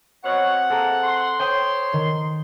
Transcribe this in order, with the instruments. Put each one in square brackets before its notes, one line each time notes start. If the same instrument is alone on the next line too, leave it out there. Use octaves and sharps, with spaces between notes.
[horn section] B2 C#5 [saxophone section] C4 F#5
[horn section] G#3 A#3 [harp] A4 A#5
[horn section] C6
[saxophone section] C5 C#5 [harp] G5 D#6
[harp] D#3